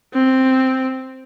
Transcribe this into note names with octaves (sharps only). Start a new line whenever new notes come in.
C4